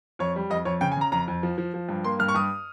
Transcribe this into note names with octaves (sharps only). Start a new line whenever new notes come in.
F2 C#5
G3
F2 D#5
F2 C#5
C#3 G5
G#5
C#3 A#5
F2 A#5
F2
F3
F3
F3
G2
A#3 C6
G2 F6
C#6
G2 D#6